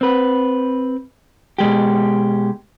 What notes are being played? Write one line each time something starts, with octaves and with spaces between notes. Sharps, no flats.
C4 B4
B2 G#3 G4